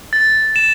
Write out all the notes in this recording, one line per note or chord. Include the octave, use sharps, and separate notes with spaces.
A6
E7